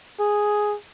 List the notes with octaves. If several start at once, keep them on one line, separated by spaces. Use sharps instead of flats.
G#4